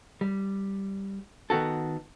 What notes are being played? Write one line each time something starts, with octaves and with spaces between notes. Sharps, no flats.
G3
D#3 B3 F#4 A4